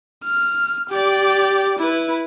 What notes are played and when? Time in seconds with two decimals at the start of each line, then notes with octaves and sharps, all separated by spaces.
0.24 F6
0.89 G4 D5
1.79 E4 B4